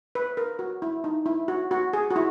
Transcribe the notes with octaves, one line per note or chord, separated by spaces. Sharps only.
B4
A#4
F#4
E4
D#4
E4
F#4
F#4
G#4
F#4
E4